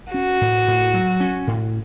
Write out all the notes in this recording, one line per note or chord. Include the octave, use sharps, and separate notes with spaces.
C#4 F#4
A2
A2
F#3
C#4
A2